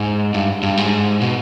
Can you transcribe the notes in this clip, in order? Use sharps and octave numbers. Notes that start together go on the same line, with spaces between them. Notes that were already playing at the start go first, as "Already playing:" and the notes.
Already playing: G#2
G2
G2
G#2
B2